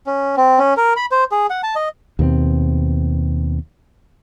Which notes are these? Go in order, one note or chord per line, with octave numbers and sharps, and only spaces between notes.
C#4
C4
C#4
A#4
B5
C5
G#4
F#5
A5
D#5
D#2 B2 A#3 C4